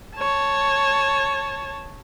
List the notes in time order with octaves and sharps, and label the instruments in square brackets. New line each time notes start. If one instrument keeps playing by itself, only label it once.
[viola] C#5 A5